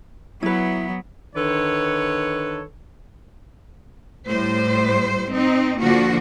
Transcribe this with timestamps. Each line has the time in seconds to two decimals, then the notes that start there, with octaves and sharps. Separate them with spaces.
0.43 F#3 B3 E4 B4
1.35 D3 D#3 A4 B4 C#5
4.27 A2 G3 C5
5.29 C4 D#4
5.77 D3 F3 A#3 F#4